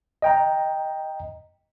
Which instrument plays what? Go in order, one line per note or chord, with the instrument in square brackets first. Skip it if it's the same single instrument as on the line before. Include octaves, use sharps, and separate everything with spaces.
[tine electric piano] D#5 G5 A#5